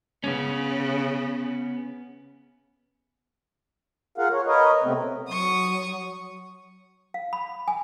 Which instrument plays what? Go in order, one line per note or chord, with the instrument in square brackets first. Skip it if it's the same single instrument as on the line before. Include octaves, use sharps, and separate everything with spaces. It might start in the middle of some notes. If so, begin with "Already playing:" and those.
[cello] C#3 [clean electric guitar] B3 C#4
[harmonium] F4 G#4 A#4 F5 F#5
C#5
A#4 B4 C#5 D#5
C3 A3 B3 C4
[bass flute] F#3 [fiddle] C#6 D#6
[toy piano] F5
B5
G#5